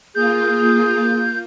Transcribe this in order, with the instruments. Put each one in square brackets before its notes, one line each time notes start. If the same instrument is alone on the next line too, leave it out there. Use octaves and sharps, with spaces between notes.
[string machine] A#3 F4 [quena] G#4 [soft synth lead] G6